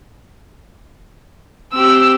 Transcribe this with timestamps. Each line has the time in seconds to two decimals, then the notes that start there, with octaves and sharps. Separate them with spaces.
1.73 C4 G4 E6